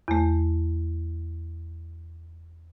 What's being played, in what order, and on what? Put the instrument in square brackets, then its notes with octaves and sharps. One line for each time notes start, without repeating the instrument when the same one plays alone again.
[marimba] E2 A3